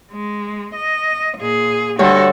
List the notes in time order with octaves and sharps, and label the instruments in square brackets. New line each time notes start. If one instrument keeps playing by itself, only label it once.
[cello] G#3
D#5
A#2 G#4
[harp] D2 G2 C#5 [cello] F#4 A4